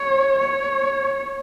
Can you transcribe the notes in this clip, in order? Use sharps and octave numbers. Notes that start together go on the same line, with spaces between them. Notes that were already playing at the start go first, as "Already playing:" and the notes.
Already playing: C#5
C#5